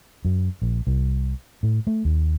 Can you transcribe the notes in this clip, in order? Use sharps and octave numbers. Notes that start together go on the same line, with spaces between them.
F#2
A#1
C2
A2
A3
D#2